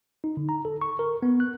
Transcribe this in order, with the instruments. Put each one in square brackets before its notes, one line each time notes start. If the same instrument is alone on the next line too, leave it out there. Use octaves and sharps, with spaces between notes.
[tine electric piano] D#4
D3
A#5
A4
C#6
A#4
B3
F#6